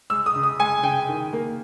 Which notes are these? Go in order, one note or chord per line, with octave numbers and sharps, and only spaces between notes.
G#3 E6
D#6
C#3
D#6
G#3 G#5
C#3 G5
D#3
A#3